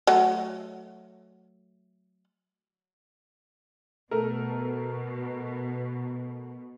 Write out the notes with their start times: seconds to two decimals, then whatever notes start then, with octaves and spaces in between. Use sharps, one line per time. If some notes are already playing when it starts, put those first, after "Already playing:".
0.07 F#3 A3
4.11 B2 A3 A4 A#4